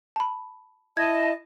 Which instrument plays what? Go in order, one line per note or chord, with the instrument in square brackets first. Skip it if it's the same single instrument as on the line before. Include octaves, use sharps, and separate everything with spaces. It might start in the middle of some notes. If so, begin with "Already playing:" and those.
[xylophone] A5 B5
[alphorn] E4 [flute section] D#5 A5 [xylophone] G#6